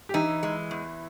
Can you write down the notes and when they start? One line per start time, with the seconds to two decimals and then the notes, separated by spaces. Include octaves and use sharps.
0.09 G4
0.14 E3 D#4 E4
0.43 G#3
0.71 E2